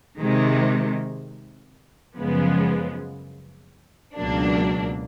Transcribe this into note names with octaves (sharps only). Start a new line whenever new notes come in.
C3 D#3 G#3
F#2 C#3 F3 G#3 B3
C#2 B2 F#3 A#3 D4